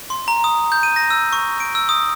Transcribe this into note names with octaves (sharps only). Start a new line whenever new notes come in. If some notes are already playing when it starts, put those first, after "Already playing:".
C6
A#5
D#6
G6
D#7
A#6
E6
C#6
D7
E6
D#6